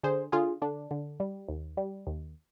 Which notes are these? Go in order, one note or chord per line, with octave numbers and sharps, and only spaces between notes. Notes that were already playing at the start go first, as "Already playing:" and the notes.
D3 G#4 C5
D3 F4 G#4
D3 D4
D3
G3
D#2
G3
D#2